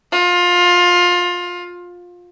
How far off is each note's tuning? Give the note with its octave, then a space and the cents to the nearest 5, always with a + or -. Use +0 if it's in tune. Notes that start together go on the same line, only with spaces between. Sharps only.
F4 +20